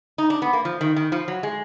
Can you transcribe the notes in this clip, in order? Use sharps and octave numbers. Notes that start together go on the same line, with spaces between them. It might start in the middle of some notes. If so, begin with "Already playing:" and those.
D#4
D4
B3
A#3
F3
D#3
D#3
F3
F#3
G#3